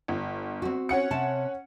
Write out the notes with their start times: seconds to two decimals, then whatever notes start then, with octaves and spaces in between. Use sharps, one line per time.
0.08 G1
0.62 C4 F#4
0.89 C#4 F#5 C#7
1.11 C3 A5